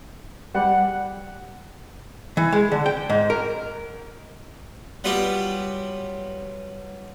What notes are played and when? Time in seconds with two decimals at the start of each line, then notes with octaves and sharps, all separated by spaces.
0.54 G3 G4 F#5
2.37 E3
2.53 G#3
2.72 D3
2.86 G5
3.10 G#2
3.30 A#4
5.04 F#3 G3 B3 F4 G4